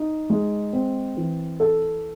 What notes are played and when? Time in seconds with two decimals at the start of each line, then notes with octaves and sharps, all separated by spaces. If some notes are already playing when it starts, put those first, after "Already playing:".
Already playing: D#4
0.30 G#3
0.73 C4
1.17 E3
1.60 A4